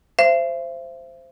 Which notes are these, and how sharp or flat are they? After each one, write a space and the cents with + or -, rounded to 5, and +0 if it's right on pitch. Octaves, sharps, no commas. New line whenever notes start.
C5 -5 E5 +40